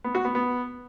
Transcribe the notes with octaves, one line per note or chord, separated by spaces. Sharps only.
B3
F#4
B3
B3